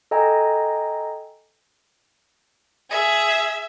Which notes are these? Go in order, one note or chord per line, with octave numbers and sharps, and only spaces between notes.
A4 D#5 G5 G#5 A#5
G#4 E5